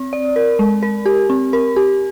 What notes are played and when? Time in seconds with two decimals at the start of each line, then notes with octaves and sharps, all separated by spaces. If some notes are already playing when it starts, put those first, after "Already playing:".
Already playing: C4
0.13 D5
0.36 A#4
0.59 G#3
0.83 A#4
1.06 G4
1.30 C4
1.53 A#4
1.76 G4